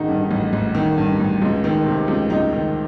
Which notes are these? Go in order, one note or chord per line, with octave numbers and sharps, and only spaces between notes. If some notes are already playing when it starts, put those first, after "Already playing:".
Already playing: A1 D#3 D#4 F#4 G#4
G2
D#4
A1
A1
D#3
G2
A1
C#2
D#3
C3
C#2
C#2 D#4
D#3